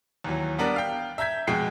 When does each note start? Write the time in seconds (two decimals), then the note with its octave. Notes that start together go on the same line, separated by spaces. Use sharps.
0.24 D#2 E3 F#3
0.58 G3 B3 D4 A#4
0.76 F5 G5
1.18 E5 A#5 G6 G#6 B6
1.47 F2 B2 G#3 G5 C7